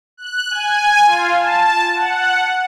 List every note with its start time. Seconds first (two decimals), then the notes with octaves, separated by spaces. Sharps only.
0.17 F#6
0.51 G#5
1.06 F4
1.38 A5
1.95 F#5